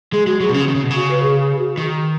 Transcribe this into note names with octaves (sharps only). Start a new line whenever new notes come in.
G#3 G#4
G#3 F#4
F#3 G#4
B2
C#3 C#4
D#3
C#3
B2
C#3 F#4
B4
G#4
G#4
F#4
D#3